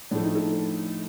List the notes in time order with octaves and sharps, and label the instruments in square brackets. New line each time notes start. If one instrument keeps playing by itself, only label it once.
[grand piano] A2 F3 A3 D4
D#4
A4